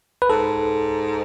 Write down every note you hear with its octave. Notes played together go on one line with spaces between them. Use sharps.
B4
G#2 A4